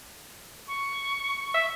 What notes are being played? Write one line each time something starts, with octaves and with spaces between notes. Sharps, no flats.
C#6
E5